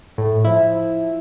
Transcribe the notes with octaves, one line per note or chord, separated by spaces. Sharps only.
A2
F3 E4